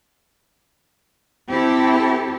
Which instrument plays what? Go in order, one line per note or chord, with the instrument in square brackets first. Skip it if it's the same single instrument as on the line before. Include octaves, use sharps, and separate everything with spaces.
[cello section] C4 E4 G4 A4